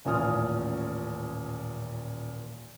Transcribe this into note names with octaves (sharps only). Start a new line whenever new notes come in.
D#1 A1 A#2 G#5 D#6 F6